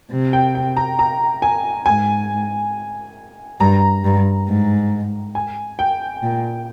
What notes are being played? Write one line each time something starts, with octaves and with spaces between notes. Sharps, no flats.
C3
G5
G5
A#5
A#5
G#5
G#2 G#5
G2 A#5
G2
G#2
G#5
G5
A#2